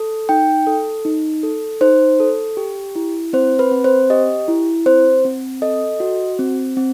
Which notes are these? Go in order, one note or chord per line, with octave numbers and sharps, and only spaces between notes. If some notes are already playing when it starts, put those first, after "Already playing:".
Already playing: A4
D#4 G5
A4
D#4
A4
D#4 C5
A4
G4
E4
C4 C5
B4
C4
C5
G4 D#5
E4
C4 C5
C4
A4 D#5
F#4
C4
C4